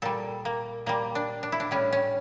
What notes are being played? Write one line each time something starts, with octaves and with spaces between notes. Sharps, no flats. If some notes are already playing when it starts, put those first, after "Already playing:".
A#2 G3 A4
A#3
A#2 G3 A#3
D4
D4
E4
D4
A2 G3 C#4
C#4